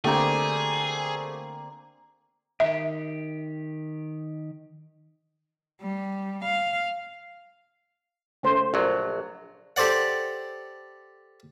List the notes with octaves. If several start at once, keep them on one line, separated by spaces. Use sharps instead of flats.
D3 A3 A#3 C4 D4 G4 G#4 D5
D#3 G4 E5
G3
F5
C#3 A3 C5
A#1 F#3
G4 A4 C5 D5 F#5